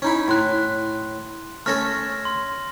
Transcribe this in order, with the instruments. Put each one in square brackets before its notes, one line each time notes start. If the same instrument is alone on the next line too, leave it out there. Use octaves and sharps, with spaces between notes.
[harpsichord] C#4 D#4 E4
[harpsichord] A2 [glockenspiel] C6 F#6
[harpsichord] A3 C#4 A4 [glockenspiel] F6 A#6
[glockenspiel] C6